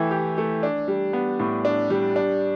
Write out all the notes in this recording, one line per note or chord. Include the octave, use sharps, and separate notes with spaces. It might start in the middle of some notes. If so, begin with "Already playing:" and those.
Already playing: E3 A3 E4 G4
G4
A3
D4
G3
B3
A2
D4
G3
D4